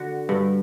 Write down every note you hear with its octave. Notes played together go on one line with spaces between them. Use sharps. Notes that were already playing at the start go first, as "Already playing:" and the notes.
Already playing: D3 F#4
G2